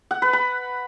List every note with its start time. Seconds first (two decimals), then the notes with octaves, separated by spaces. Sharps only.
0.11 F#5
0.22 B4
0.33 B5